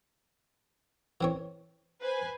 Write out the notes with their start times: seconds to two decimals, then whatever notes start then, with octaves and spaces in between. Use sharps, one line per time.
1.21 E3 C4 C#5
2.01 B4 C5 G#5